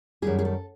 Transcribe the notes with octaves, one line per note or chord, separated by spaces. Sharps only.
F#2 D#3 G3 G#4
G#4
A4